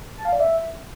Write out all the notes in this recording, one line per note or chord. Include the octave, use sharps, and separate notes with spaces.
A5
F5
D5
E5